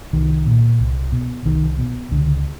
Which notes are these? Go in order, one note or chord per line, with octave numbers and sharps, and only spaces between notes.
C2 D#3
A#2
C2
B2
C2 D#3
B2
C#2 D3